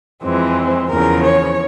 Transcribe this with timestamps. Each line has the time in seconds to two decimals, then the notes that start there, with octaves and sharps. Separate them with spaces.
0.22 F2 E3 G#3 C4
0.90 E2 C#3 F3 A#4
1.23 C#5